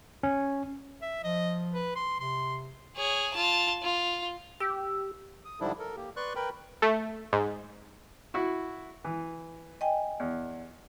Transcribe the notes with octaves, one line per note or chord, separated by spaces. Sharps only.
C#4
E5
F3 D#5
B4
C6
C3 C6
G#4 C#5
F4 A5
F4
G4 E6
D#6
G#2 D3 F3 G3 D4 E4
A4 A#4
A#3 G4
B4 D5 C6 C#6 F#6
A#4 B4 G5 B5
A3
G#2
E4 F#4
E3
D#5 G5 G#5
E2